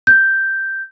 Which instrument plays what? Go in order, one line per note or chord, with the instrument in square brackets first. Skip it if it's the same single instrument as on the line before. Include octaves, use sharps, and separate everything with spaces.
[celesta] G6